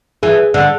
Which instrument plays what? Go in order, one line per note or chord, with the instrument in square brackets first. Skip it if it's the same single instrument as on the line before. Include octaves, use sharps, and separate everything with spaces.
[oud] E3 [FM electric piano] G#4
[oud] D3